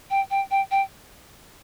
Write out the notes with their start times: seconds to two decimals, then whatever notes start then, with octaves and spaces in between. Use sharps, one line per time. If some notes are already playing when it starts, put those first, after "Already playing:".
0.10 G5
0.30 G5
0.50 G5
0.71 G5